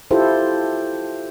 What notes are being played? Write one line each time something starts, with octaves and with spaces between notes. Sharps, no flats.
E4 F4 G4 A4 C5